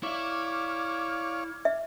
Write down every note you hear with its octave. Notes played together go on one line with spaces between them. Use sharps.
E4 C#5 D5 E5 F5 D6 F6 G#6
E5